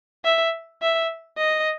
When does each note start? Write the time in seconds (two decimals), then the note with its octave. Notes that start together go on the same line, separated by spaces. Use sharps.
0.24 E5
0.82 E5
1.38 D#5